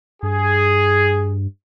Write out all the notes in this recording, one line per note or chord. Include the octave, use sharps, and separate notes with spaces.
G2 G#4